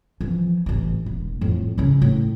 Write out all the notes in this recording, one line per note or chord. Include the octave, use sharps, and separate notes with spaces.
E3 F3
A1 E3
E1
F2 A2
C#3 C#4
A2